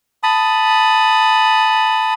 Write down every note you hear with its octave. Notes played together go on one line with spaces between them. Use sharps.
A5 B5 D#6